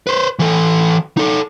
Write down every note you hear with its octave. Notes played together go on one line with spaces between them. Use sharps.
B4 C5
E3 A4
D#4 A4